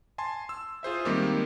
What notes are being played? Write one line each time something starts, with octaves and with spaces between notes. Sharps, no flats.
G#5 A5 C6
E6
F4 G#4 C5 E5
D#3 G3 G#3 A#3 C4 G4